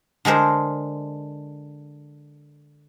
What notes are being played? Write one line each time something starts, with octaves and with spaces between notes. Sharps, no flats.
D3 G#3 A#4 C5